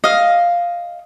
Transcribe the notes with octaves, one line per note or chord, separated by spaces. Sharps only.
D#5 F5